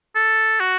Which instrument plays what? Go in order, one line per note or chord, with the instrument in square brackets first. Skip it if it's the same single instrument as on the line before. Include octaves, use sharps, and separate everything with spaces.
[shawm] A4
F#4